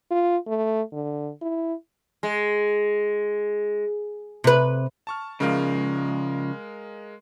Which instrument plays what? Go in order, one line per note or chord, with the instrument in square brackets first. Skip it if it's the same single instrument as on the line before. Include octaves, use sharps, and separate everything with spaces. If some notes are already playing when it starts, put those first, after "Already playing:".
[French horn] F4
A3
D3
E4
[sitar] G#3
[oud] C3 B4
[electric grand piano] A5 C#6 F6
[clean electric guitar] C#3 F3 [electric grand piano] G#3 A#4 F5